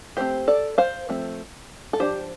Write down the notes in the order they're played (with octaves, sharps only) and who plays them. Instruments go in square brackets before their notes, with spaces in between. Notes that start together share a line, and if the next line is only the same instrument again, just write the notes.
[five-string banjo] F3 A3 C4 G4 C5
A4 D5
C5 F5
F3 A3 C4
A4
F3 D4 G4 C5